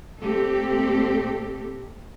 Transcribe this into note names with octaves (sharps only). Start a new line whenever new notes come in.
A#2 A3 C4 G4 A4